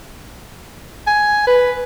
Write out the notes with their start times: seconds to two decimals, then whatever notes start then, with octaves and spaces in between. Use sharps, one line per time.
1.07 G#5
1.47 B4